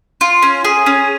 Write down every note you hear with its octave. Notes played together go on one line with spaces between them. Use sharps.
F4
C#4
G#4
C#4